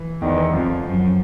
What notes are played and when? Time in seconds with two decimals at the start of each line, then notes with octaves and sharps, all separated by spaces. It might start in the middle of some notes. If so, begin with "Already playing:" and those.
Already playing: E3
0.22 E2 D#3
0.38 E3
0.53 F2 F3
0.85 F#2